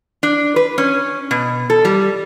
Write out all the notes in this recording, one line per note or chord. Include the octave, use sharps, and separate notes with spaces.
D4
B4
C#4
B2
A4
G3